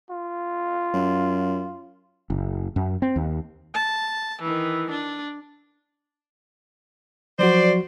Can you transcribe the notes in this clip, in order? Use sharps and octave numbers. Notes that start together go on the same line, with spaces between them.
F4
F#2
F#1
F#2
C4
D#2
A5
D#3 E3
D4
F3 F#3 F#4 C5 D5